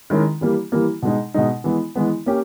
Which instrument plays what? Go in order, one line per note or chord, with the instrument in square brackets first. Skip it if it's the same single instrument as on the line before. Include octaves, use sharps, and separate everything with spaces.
[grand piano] D#3 G#3 C#4 E4 A#4
E3 G3 A#3
E3 G3 A#3
B2 G#3 D#4
B2 G#3 D#4
E3 G#3 B3
E3 G#3 B3
A#3 C#4 G4